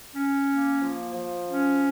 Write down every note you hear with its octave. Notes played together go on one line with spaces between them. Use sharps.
C#4
A#3
F3
F3
C#4